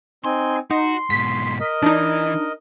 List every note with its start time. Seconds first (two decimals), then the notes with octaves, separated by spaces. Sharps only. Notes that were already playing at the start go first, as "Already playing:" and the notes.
0.25 C4 D#4 G#5 C6
0.71 D#4 F#4 C6
1.10 G#2 B2 B6
1.60 A#4 D#5
1.83 E3 D4 D#4